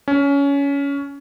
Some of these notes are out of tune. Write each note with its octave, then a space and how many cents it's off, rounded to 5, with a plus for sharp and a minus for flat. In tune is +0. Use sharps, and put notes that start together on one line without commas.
C#4 +20